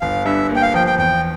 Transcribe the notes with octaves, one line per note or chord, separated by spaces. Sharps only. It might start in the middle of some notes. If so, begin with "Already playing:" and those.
G1 F5
G2 E5
A#3
G5
F5
F3 G5
G5
E2 G5